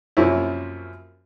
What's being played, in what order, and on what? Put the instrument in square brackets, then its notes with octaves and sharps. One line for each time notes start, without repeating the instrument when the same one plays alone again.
[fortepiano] F#2 C3 F3 A#3 C#4 E4